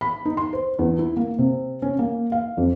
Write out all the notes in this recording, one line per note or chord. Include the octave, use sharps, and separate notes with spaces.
B5
D#4
C6
C5
E2
E4
A#3
C3
C#4
A#3
F5
F2